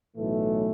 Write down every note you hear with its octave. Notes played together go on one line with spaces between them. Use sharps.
B1 A2 E3 A3